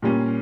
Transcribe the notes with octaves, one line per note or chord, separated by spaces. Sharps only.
A#2 G3 A#3 C#4